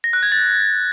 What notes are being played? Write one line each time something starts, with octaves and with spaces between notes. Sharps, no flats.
A#6
F#6
G#6
A6